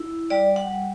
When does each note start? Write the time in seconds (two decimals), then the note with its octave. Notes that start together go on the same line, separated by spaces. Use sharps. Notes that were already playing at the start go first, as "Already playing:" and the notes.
Already playing: E4
0.30 G3 D5
0.56 F#5
0.68 G3